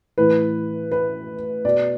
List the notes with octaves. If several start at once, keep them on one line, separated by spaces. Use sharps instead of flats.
A2 E3 B4
B4
B2 D5